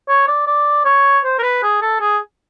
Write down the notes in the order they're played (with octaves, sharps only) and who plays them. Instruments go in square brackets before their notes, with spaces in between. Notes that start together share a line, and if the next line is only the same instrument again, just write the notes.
[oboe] C#5
D5
D5
C#5
C5
A#4
B4
G#4
A4
G#4